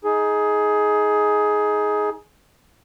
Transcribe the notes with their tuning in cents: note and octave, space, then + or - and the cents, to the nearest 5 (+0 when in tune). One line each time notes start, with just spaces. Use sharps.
D#4 +20 G#4 +15